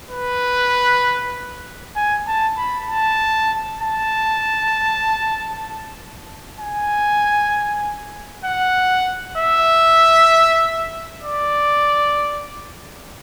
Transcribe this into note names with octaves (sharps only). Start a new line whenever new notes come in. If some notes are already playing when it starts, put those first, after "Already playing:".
B4
G#5
A5
B5
A5
A5
G#5
F#5
E5
D5